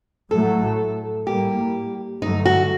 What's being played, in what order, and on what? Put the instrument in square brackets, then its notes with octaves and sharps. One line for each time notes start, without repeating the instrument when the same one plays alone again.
[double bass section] A2 F#3 A3 [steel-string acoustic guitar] A4
[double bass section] A2 G3 A#3 [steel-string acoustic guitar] G4
[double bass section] G2 D3 F#3 A3 [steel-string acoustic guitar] D#4
[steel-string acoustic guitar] F#4